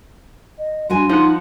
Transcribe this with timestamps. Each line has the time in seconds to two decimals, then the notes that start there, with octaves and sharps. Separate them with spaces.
0.59 D#5
0.90 G2 F#4 G#5 C6
1.09 F3 D#4 F#5